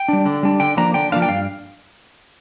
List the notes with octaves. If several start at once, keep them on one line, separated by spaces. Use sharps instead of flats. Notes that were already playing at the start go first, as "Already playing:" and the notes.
Already playing: G5
G3 D4
D3
G3 D4
D3 G5
F3 A#3 D4 A#5
D3 G5
F3 A#3 D4 F5
G5
G2 F5